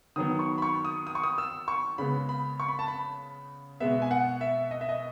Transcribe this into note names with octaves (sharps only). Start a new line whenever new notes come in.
D#3 F#3 B3 D#6
C#6
B5
C#6
D#6
D#6
C#6
D#6
E6
C#6
C#3 G#3 B3 B5
B5
C#6
B5
A5
B5
B2 G#3 B3 E5
G#5
F#5
E5
D#5
E5
D#5